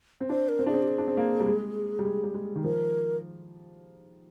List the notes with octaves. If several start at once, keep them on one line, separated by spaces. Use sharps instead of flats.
C4
D4 C5
A#4
C4
D4 G#4
C4
G4
G#4
D4
C4
A#3
G3
G#3
G3
G#3
G3
G#3
D#3
F3 A#4